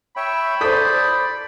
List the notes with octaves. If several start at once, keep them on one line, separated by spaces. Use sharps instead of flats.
C#5 E5 G5 B5
A4 C5 D5 D#6 G6 B6